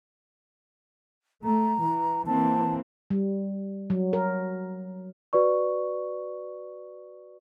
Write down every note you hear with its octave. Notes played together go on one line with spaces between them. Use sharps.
A3 A#5
E3
E3 A#3 C4 A5
G3
F#3
A#4
F#4 B4 D5 C#6